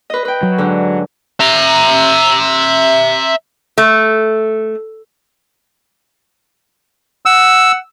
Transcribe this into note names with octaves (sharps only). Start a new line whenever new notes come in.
B4 D#5
B4 G5
F#3
G#2 D3
E5 A#5
A3
F#5 E6